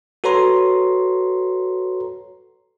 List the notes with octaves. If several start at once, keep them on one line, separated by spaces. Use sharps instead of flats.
F#4 A4 B4 C#5 A#5 C6